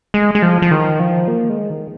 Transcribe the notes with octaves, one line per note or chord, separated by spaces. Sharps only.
G#3
G#3
F3
F3
D#3
F3
A#3
G#3
D#3